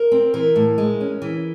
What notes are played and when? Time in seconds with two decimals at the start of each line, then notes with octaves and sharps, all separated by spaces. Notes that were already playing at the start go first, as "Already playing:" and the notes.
Already playing: A#4
0.12 C4
0.34 E3 A#4
0.56 A2
0.78 G#3
1.01 C#4
1.22 E3